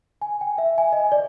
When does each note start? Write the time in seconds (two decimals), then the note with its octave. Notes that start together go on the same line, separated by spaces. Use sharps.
0.22 G#5
0.41 G5
0.58 E5
0.78 G#5
0.93 D#5
1.12 D5